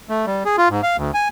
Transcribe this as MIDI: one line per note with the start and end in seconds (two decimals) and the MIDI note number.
0.09 0.26 57
0.27 0.43 55
0.45 0.56 68
0.58 0.69 65
0.70 0.81 44
0.83 0.97 77
0.97 1.11 38
1.14 1.28 80